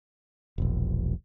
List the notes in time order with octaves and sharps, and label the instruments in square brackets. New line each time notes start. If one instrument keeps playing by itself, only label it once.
[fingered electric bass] E1 A#1